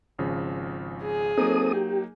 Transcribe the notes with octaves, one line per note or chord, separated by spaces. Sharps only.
G#1 C#3 F3
G#4
F#3 A#3 C4 D#4 A4 D#6
G4